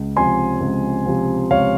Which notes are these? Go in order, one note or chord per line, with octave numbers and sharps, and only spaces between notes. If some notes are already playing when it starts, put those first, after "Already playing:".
Already playing: C#2
C3 F3 C4 G#5 C6
C#2
C3 F3 C4
C#2 C#5 F5